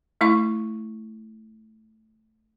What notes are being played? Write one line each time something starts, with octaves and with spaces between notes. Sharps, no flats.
A3 E4 F5 C#6